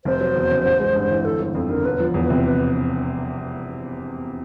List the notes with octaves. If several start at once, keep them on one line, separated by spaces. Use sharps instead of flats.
F1 C5
F#3
E2
C#3
A1
G#3
G2
E3
G1 A4
G1
F2 A4
D3 A#4
E1 B4
F3
E2
B4
C3
B4